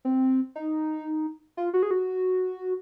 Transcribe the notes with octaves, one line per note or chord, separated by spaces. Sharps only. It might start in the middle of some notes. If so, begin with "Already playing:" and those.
C4
D#4
F4
F#4
G#4
F#4